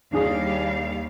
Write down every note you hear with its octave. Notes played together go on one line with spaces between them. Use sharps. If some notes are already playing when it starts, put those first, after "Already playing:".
D#2 G3 D4 G#4 F5